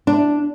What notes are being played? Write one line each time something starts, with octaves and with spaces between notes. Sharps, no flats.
D4